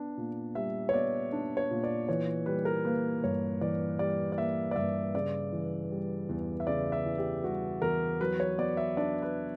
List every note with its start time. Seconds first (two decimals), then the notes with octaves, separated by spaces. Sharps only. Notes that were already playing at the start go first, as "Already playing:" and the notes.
Already playing: B3 D4
0.17 A#2
0.55 G3 E5
0.89 C#5
0.94 B3 D5
1.33 D4
1.57 C#5
1.71 A#2
1.84 D5
2.09 E3 C#5
2.46 G3 B4
2.65 A#4
2.85 A#3 B4
3.24 G2 C#5
3.61 E3 D5
3.99 G3 D5
4.32 D5
4.38 A#3 E5
4.71 D5
4.76 G2 E5
5.15 C#3 D5
5.53 E3
5.91 G3
6.29 E2
6.60 E5
6.67 C#3 D5
6.92 E5
7.06 E3
7.18 G4
7.44 G3 F#4
7.82 E2 A#4
8.21 F#3 B4
8.40 C#5
8.58 B3 D5
8.77 E5
8.97 D4 D5
9.22 B4